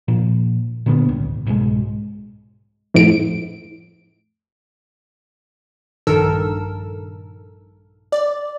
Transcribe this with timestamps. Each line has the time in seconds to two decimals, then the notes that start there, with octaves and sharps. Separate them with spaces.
0.08 A#2 F3
0.86 A#2 D3 G#3 B3
1.09 D1 G#1 C#2
1.47 C2 G#2 B2 G#3
2.94 F2 A2 D7
6.07 A#1 G2 D#3 A4 A#4 E6
8.12 D5